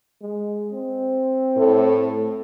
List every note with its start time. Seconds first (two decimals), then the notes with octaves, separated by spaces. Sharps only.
0.22 G#3
0.72 C4
1.57 A2 A4